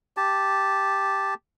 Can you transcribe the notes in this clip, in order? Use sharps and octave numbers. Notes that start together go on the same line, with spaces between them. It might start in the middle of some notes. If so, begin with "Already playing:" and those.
G4 A5